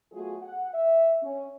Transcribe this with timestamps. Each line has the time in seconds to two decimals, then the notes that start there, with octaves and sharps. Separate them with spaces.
0.12 F#3 A3 B3 F4 F#4 G#4
0.42 F#5
0.74 E5
1.23 C#4